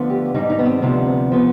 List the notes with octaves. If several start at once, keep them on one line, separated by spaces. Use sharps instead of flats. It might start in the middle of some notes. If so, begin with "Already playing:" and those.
Already playing: D2 D3 F3 B3
G4
G#2 D#3 G3 D#4
D#4
B3
C4
D2 C3 F3 B3
F3 B3